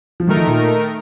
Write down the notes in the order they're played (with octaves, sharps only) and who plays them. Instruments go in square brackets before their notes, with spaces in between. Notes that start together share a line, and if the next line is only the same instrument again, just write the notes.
[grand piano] F3
[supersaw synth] D#3 A3 D#4 A#4 [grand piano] F#3
[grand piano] F3
A#2